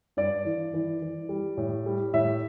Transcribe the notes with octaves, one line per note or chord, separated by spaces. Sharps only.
G2 D5
E3
E3
E3
G3
A2
G3
A2 E5